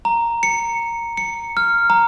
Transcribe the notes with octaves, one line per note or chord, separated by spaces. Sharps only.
A#5
C#7
C#7
F6
A#5